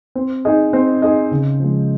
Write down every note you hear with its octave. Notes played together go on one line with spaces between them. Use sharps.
C4
D#4 G#4 D#5
C4
D#4 G#4 D#5
C#3
F3 G#3